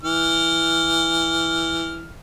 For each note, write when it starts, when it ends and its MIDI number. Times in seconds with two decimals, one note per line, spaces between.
0.03 2.13 52
0.03 2.13 89